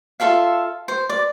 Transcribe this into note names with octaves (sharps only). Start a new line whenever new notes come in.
F4 A4 E5 F5
C5
D5